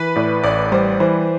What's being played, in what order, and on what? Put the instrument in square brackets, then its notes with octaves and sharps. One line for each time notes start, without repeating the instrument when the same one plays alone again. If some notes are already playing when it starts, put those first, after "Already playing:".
Already playing: [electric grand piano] E3 [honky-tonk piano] B4
[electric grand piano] A2 [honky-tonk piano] D5
[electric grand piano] A1 [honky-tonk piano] D5
[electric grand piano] G3 [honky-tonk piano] C5
[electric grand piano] E3 [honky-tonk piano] C5